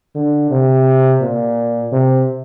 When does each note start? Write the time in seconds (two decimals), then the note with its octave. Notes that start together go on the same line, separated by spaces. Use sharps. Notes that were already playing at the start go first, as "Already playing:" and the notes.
0.15 D3
0.51 C3
1.22 A#2
1.92 C3